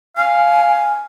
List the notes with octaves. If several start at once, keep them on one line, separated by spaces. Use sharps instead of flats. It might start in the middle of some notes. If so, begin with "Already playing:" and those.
F5 G#5